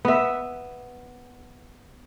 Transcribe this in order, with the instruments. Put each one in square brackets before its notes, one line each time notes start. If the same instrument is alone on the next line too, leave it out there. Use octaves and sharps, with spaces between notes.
[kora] B3 E5